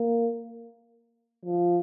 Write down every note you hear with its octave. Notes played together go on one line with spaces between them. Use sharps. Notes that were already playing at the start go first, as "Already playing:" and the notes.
Already playing: A#3
F3